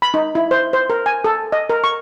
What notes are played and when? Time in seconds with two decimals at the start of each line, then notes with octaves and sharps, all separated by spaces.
0.02 B5
0.14 D#4
0.35 E4
0.51 C5
0.73 C5
0.90 A#4
1.06 G#5
1.24 A4
1.52 D#5
1.70 A#4
1.84 C#6